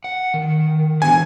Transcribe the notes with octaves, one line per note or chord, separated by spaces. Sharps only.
F#5
D#3
E3 B3 D4 G#5